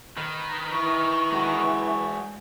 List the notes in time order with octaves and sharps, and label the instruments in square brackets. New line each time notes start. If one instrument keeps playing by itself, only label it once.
[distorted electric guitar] D#3 [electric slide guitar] B4
[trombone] E3 [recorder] C#6
[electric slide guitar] G#3 F#4